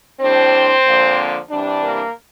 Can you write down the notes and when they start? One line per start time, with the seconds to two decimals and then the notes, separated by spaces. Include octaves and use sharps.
0.21 A2 G3 C4 D4 C5
0.86 D3 F3 A#3
1.50 C3 E3 G3 D4
1.83 A#3 A#4